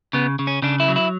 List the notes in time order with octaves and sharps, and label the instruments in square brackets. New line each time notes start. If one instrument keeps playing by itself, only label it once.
[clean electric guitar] C#3 B3
C#3
C#4
C#3 D4
E4
F#3
E4